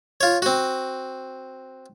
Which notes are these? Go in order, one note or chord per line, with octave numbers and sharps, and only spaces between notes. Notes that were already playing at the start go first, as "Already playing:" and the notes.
F4 C#5
C4 F#4